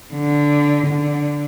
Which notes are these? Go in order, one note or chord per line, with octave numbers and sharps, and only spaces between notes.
D3
D3